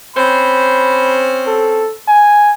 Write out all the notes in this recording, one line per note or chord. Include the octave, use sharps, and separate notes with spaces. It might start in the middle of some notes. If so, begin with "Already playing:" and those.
C4 C#4 C5 B5
A4
G#5